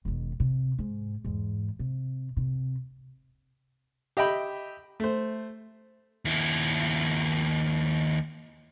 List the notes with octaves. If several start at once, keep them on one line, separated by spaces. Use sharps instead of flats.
E1 D#3
C3
G#2
E2 G#2
C3
C3
G4 D#5 E5 G5 B5
A3 C5
D#2 E4